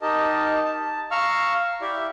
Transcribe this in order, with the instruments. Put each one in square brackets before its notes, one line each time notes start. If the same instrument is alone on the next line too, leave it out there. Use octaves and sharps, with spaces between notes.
[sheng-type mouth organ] D#4 G4 A#4 D#5 A5
A5
F5 A#5 C#6 E6 F6
E4 G4 D5 E5